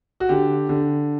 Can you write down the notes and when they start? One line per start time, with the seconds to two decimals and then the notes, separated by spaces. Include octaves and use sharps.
0.20 F#4
0.29 D3 G4
0.69 D3